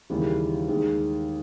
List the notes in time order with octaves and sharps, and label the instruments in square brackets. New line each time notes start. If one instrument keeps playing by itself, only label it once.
[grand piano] D#2 C#3 E3 G3
D#2 D#3 G#3